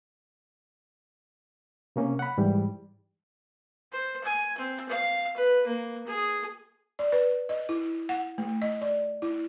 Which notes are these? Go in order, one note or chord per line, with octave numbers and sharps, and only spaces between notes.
C3 A#3 C#4
F#5 B5
G#2 E3 G3
C5
G#5
C4
F5
B4
A#3
G#4
D5
B4
D#5
E4
F#5
A3
D#5
D5
E4